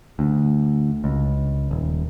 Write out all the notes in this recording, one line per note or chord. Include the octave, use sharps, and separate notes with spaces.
D2
C#2
D#1